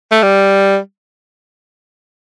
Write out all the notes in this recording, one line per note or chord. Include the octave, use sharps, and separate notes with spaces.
A3
G3